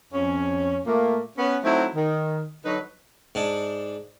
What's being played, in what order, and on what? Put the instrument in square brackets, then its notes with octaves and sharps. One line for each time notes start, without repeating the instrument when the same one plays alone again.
[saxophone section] F2 C#4
A#2 A3 A#3
B3 C#4
F#3 A3 C4 D#4 E4
D#3
D3 F#3 D#4 B4
[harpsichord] G#2 D4